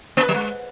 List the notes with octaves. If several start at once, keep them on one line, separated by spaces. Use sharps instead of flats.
A#3
B4
F#3
G#3